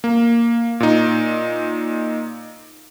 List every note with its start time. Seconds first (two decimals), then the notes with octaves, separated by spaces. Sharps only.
0.04 A#3
0.80 A#2 D#4